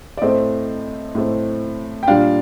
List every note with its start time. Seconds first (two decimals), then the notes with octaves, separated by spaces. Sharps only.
0.17 D5
0.22 A2 A3 C4 C5 D#5
1.15 A2 A3 C4
2.03 G5
2.07 A#2 G3 D4 D5 F5